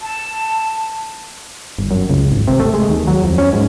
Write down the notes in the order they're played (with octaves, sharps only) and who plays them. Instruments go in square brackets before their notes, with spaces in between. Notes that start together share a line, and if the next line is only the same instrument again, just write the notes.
[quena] A5
[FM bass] G1
F#2
C#2
G#1
C3
A3
G#3
D#2
F#3
F2
C#4
G#2